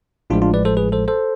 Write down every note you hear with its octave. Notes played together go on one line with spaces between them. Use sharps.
A1 A2 F3 G#3 D4 F4
D4 F4
B4 D5
A4 C5
G#4 B4
A4 C5
A4 C5